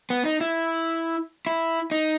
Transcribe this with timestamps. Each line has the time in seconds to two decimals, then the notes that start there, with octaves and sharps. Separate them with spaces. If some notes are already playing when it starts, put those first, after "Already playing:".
0.10 B3
0.25 D#4
0.41 E4
1.47 E4
1.91 D#4